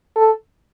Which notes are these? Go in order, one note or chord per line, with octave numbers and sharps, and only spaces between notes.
A4